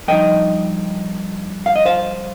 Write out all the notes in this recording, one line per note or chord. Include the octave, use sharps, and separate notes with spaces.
G2 F3 D#4 D#5 G5
F5
D#5
C5 F5